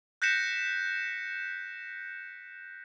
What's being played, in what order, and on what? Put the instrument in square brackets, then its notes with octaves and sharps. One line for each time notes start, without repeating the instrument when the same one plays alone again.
[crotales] F#6 G6 A#6 B6 C#7 E7